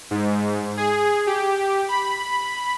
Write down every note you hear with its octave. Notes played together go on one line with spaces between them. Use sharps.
G#2
G#4
G4
B5